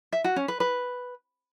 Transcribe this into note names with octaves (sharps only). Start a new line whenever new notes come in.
E5
F#4
C#4
B4
B4